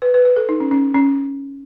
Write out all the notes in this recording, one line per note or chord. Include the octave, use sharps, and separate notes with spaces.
B4
B4
B4
A4
D#4
C#4
C#4
C#4